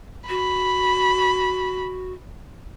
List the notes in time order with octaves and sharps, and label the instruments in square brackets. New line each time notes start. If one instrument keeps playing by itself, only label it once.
[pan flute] F#4 [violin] B5